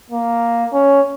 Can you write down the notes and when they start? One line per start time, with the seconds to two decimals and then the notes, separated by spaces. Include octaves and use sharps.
0.10 A#3
0.73 C#4